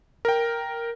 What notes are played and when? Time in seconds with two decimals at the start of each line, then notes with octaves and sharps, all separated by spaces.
0.25 A#4 G5